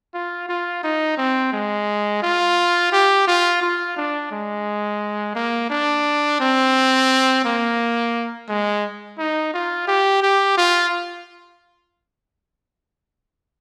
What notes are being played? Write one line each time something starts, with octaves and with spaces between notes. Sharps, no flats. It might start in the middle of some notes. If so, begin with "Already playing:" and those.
F4
F4
D#4
C4
G#3
F4
G4
F4
F4
D4
G#3
A#3
D4
C4
A#3
G#3
D#4
F4
G4
G4
F4